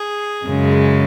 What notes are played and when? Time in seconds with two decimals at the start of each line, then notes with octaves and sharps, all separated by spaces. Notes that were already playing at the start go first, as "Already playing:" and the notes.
Already playing: G#4
0.45 F#2 C#3 G#3